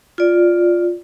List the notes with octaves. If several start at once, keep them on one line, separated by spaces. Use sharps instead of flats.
F4 D5